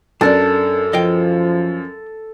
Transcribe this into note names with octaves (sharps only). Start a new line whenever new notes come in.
F#2 D4 A4 A#4 D5
F3 D#5 F5 G5